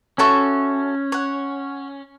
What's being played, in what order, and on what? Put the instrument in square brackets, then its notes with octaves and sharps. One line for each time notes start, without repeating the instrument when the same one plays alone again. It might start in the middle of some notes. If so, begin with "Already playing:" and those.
[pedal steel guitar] C#4 [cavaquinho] F#4 A4 E5 C#6
[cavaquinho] C#5 F#5